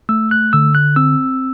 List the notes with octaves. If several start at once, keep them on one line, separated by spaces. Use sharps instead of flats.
A3 E6
F#6
D3 E6
F#6
C4 E6